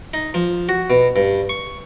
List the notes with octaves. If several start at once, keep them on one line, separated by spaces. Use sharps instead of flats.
D#4
F3
F#4
B2
G2
C#6